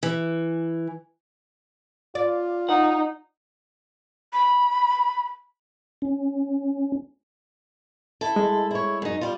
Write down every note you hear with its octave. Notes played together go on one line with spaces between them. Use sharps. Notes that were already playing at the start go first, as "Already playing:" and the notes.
E3
F4 D5
D#4 F#5
B5
C#4
E4 A4
G#3
E4 C#5
F#2 D#4
G3 F4